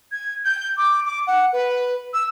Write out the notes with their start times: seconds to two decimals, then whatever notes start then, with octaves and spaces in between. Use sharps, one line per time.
0.12 G#6
0.45 G6
0.77 D6
1.05 D6
1.27 F#5
1.53 B4
2.14 E6